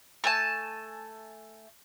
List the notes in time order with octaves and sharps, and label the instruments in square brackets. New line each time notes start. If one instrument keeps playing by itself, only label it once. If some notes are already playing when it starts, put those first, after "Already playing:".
[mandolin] A3 G#5 A5